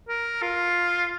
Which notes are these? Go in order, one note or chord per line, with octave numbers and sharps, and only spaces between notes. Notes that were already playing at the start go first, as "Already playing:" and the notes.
A#4
F4